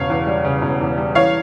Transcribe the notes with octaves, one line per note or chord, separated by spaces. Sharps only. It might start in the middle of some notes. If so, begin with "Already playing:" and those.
Already playing: E1 C#3 C#5 F5
E2
G3
C#3
E1
E2
G3
E3 C#5 F5